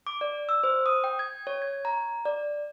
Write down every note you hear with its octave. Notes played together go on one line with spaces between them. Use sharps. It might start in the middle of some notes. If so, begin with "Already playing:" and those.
D6
D5
E6
C5
D#6
G5
G#6
C#5
G#6
A#5
D5